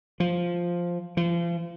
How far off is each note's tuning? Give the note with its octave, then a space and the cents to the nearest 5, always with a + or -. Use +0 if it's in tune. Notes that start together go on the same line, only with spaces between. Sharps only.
F3 +0
F3 -35